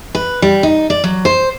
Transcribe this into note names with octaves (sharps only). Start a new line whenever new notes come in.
B4
G3
D#4
D5
F#3
C5